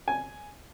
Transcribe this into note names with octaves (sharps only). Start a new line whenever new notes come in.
G#5